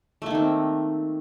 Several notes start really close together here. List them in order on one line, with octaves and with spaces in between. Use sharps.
A3 A#3 D#3 C4